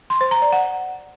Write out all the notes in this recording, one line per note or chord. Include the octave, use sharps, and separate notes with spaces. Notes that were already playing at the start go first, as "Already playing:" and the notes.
C6
C5
A#5
D5
F#5